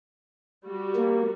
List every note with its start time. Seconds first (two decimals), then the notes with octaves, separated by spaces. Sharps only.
0.66 G3 F#4
0.96 A#3